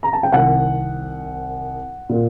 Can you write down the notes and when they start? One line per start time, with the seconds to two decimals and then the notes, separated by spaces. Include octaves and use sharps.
0.03 A#5
0.13 A5
0.23 G5
0.32 C2 C3 D#3 F#5
2.09 A#2